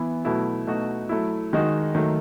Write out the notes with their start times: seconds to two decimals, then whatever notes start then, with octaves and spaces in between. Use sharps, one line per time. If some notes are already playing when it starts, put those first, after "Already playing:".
Already playing: E3 B3 E4
0.25 B2 F#3 A3 E4
0.67 B2 A3 D#4 F#4
1.09 F#3 A3 E4
1.53 D#3 G#3 D#4 F#4
1.95 D#3 F#3 A3